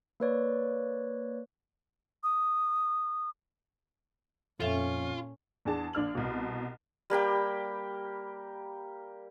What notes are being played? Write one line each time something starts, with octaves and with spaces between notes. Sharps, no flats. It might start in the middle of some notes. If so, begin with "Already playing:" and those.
A#3 B4 C#5 D5
D#6
F2 A#2 C#4 F4 A4 E5
E2 D4 G#4 A5
A#1 D4 F6 F#7
C2 B2
G3 A#3 G4 G5